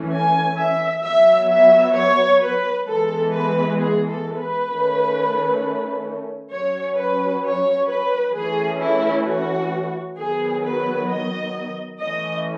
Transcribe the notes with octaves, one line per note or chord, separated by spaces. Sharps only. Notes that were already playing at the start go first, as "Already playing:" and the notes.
Already playing: E3 A3 C#4
G#5
E5
F#3 B3 E5
E5
C#5
B4
E3 G#3 B3 A4
B4
G#4
A4
B4
D#3 A3 C#4
F#3 C#4 C#5
B4
C#5
B4
E3 A3 C#4 G#4
E4
F#4
D#3 F#3 B3 G#4
B4
D#5
E3 A3 C#4 D#5